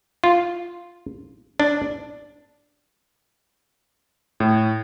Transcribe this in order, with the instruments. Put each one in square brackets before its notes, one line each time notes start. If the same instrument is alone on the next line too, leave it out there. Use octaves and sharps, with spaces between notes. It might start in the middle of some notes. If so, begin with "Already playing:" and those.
[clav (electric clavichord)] F4
D4
[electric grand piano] A2